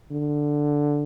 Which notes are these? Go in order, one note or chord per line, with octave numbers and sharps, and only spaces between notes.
D3